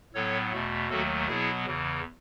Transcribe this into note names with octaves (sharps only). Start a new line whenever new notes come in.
A2 F#3 B3 A4 C#5
E2 B2 A3
D#2 D#3 F#3 A3 F#4 A4
B2 F#3 B3 E4 G#4
E2 C#3 E3